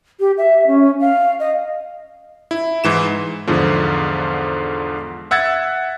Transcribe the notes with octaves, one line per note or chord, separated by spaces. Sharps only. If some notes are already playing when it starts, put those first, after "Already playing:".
G4
E5
C#4
F5
D#5
E4
G#2 E3 E7
E2 G#2 D3 F3
E5 F#5 E6 G#6 A6